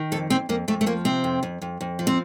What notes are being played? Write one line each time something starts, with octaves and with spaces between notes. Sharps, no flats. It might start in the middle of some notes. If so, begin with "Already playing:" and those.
Already playing: D#3
F2 A4
F2 C4
F2 A#3
F2 A3
A3
F3 A#3
C3 C4
F2
F2
F2
F2
F3
C4